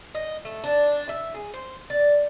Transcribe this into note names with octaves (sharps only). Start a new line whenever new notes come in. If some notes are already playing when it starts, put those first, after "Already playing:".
D#5
A3
D4
E5
G#4
C5
D5